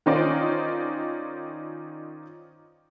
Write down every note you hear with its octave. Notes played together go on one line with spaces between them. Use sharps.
D#3 C#4 D#4 F4 C5 D5